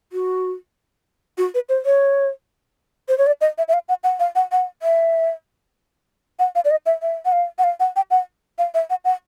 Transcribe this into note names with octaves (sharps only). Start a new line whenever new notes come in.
F#4
F#4
B4
C5
C#5
C5
C#5
D5
D#5
E5
E5
F5
F#5
F#5
F5
F#5
F#5
E5
F#5
F5
D5
D#5
E5
E5
F#5
F5
F#5
F5
F#5
G5
F#5
F5
E5
F#5
F#5